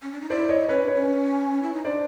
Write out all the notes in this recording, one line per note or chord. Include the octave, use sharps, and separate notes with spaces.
C#4
D4
D#4
E4 C5 D5
C#5 D#5
C#4 B4 C#5
D4
B4 C#5
C#4
E4
D#4
D4 C5 D5